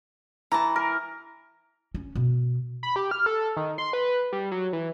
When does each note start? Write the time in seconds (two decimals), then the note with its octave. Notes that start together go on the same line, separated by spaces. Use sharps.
0.52 E3 A5 A#5
0.76 A#4
1.94 C#4
2.15 B2
2.83 B5
2.96 G4
3.11 F6
3.26 A4
3.57 D#3
3.78 C6
3.93 B4
4.32 G3
4.51 F#3
4.73 E3